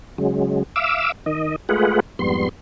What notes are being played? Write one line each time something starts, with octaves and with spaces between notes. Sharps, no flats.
C#3 F#3 G#3
E5 F5 D6 E6
D#3 D#5
G#3 A3 F4 G#4 B4 F#5
F2 G#2 G3 B3 C6